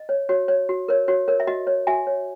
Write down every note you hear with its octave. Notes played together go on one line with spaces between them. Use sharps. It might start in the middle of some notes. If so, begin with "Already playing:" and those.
Already playing: D#5
C#5
F#4 C#5
C#5
F#4
A#4 C#5
F#4 C#5
A#4 C#5
E5
F#4 D#5
C#5
F#4 E5 G#5
C#5